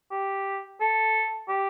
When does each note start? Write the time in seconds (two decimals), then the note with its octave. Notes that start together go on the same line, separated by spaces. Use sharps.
0.11 G4
0.81 A4
1.49 G4